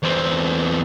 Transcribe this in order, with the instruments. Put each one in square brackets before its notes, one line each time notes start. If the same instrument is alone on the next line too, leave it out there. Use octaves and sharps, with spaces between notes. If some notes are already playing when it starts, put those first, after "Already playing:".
[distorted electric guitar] E2 C4